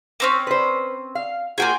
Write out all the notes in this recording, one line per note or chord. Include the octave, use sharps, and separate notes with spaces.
A#3 C4 C#4
B4 C5
F5
A#3 F4 F#4 G#4 G5 G#5